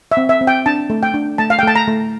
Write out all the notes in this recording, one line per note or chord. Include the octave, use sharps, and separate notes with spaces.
E5
C4
E5
C4
G5
D4 A5
A3
G5
D4
A3 A5
F5
G5
A3 A5
A#5
A3